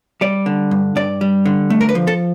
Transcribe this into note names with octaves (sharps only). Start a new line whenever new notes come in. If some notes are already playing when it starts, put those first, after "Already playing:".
G3 D5
D3
G2
G2 D5
G3
D3
A3
A#4
B4
F3
A4